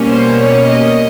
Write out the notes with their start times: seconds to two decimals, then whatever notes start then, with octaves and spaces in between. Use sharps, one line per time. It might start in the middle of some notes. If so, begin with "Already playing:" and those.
Already playing: B2 G3 A#3 C#4
0.10 C5
0.40 C#5
0.70 D#5